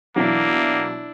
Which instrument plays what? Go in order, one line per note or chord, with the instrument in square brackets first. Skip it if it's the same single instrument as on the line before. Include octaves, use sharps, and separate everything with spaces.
[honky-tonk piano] B2 E3 F#3 [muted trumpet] A#3 [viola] D4 E4